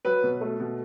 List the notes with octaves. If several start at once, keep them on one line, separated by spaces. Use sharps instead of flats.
F#3 B4
B2
A3
B2